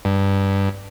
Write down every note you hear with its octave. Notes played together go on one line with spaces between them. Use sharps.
G2